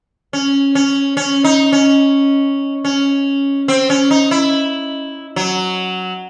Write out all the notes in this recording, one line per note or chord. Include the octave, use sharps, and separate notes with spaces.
C#4
C#4
C#4
D#4
C#4
C#4
C4
C#4
D#4
E4
F#3